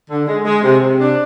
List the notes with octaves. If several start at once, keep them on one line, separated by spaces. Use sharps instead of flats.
D3
G#3
G#3
C3
C3
D4